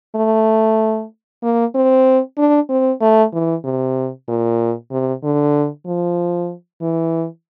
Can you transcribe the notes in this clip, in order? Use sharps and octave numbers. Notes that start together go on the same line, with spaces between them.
A3
A#3
C4
D4
C4
A3
E3
C3
A#2
C3
D3
F3
E3